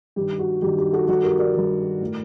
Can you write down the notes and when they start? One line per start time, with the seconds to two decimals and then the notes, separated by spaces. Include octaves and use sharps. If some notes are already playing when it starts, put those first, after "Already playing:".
0.16 G2 D#3 G4
0.39 F#4
0.62 G2 D#3 G4
0.78 G4
0.93 F#4 A4
1.08 G2 D#3 F#4 A4
1.23 G4 A#4
1.39 A#4 D5
1.55 G2 D#3
2.01 A2